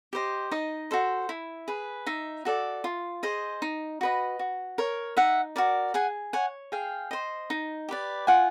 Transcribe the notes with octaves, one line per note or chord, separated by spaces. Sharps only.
G4 C5 D#5
D#4 D#5
F#4 A4 C5
E4
G#4 B4
D#4 E5
F#4 A4 D5
F4
G#4 C5 D#5
D#4
F#4 B4 D#5
F#4
A#4 C#5
D#4 E5 F#5
F#4 A#4 D5
G#4 F#5 G#5
C#5 F#5 G#5
G#4 F5 G5
C5 D#5
D#4
G4 B4 D5
F4 F#5 G#5